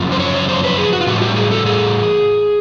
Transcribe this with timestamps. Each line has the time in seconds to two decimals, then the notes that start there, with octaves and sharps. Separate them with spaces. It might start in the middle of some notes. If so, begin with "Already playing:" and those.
Already playing: F#2 C#3 F3
0.12 C5
0.20 C#5
0.49 C5
0.64 B4
0.78 G#4
0.93 F#4
1.01 F4
1.07 A2 E3 G3 F#4
1.22 G4
1.36 G#4
1.51 A4
1.66 G#4